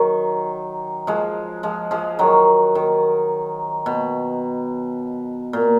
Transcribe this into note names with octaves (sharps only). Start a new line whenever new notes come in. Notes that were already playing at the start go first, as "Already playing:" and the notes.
Already playing: D#3 F#3
F3 G#3
F3 G#3
F3 G#3
D#3 F#3
D#3
B2
A#2